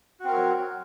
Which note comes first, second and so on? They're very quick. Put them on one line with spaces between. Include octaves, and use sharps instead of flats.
F#4 C4 A#4 F#3